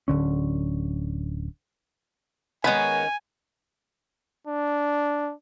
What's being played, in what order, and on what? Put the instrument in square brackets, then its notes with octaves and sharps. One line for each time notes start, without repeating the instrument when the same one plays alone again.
[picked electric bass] D1 D#2 D3 C#4
[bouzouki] D#3 C#4 [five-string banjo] G#3 B3 B5 [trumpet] G#5
[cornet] D4